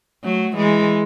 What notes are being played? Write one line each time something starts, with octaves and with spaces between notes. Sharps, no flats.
F#3 A3
E3 G#3